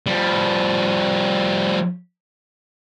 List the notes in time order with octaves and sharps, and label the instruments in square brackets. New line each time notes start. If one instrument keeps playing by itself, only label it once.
[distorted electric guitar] F3 G3